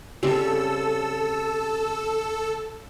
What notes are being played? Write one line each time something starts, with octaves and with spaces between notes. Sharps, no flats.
C#3 G3 C4 A4 E6